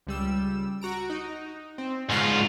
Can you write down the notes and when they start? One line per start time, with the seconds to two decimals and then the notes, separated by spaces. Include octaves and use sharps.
0.07 C#2 G3 E6
0.81 F#4 A#5 D7
1.10 D#4
1.78 C4
2.10 G#2 F4 D#5 F5 C#6